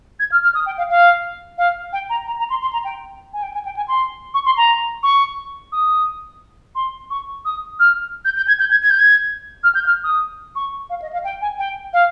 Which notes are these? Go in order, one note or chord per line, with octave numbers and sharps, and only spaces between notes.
G#6
F6
F6
D#6
G5
F5
F5
F5
G5
A#5
A#5
A#5
C6
C6
A#5
G5
G#5
G5
G#5
G5
G#5
C6
C#6
C6
A#5
C#6
D#6
C6
C#6
D#6
F6
G6
G6
G#6
G6
G#6
G#6
G6
G#6
F6
G6
F6
D#6
C#6
F5
D#5
F5
G5
G#5
G5
F5